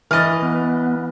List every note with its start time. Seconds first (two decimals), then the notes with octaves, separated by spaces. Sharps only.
0.11 E3 D#5 F6 A6
0.42 B3